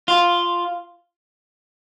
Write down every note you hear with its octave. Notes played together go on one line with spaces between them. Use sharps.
F4